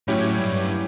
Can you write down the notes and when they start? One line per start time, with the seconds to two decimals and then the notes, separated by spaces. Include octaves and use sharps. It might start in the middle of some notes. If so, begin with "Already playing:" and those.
0.08 A2 F#3 C#4 E4 G4 C#5
0.39 G2